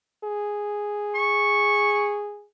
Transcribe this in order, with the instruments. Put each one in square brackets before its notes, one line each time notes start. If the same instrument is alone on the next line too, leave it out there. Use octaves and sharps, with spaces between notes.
[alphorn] G#4
[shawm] C#6